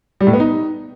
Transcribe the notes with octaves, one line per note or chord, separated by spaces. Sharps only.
G3
A2
B3
D#4